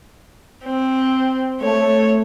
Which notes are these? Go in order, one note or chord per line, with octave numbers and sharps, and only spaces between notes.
C4
A3 C#5